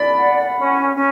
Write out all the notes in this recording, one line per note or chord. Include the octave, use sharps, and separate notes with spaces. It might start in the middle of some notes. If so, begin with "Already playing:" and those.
Already playing: D5 B5
F#5
C#4
C#4